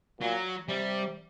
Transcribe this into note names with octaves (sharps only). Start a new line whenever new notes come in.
A#2 F#3
C3 G3